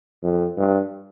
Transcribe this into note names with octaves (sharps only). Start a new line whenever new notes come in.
F2
G2